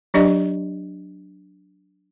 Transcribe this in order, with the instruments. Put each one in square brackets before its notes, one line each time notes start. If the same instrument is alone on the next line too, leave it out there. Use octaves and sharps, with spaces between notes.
[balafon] F#3 D4 G4 D5 D#5